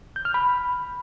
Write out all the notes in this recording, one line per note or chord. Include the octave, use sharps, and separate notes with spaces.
G6
F6
B5